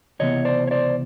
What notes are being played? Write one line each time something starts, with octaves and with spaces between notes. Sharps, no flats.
C#2 C3 E3 B3 C#5 D#5
C5 D5
C#5
C5 D5